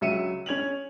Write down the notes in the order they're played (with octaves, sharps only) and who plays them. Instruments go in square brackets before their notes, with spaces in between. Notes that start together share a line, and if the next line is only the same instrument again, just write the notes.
[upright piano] C#2 F#3 E5 C#7 D#7 E7
C#4 G#6 F7 F#7